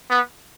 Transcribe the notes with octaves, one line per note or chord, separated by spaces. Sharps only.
B3